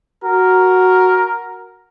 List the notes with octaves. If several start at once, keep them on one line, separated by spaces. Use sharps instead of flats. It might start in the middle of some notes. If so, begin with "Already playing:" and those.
F#4 A#4